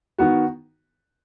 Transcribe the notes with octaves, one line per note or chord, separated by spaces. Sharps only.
D#3 B3 F#4